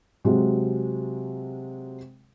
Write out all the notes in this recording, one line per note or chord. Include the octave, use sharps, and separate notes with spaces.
C3 F#3 G#3